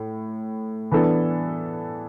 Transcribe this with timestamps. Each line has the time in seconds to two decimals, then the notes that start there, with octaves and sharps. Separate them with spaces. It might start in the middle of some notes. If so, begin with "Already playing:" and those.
Already playing: A2
0.91 E3 B3 D4 A4